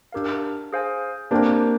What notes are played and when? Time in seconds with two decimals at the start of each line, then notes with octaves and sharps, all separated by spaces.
0.12 D4 G4 A#4 F5
0.73 G#4 C5 F5 G#5
1.31 A#3 C4 D4 G4 C5